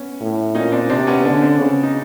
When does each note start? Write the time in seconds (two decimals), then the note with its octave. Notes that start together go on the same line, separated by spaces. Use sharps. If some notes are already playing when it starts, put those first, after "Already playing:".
Already playing: B3 C#4
0.21 A2
0.55 A#2 C#4 D#4
0.72 C4 D4
0.90 C3 C4 D4
1.07 B3 C#4
1.25 D3 D4
1.34 C#4
1.42 C4 D4
1.59 C#3 B3 C#4
1.83 D#4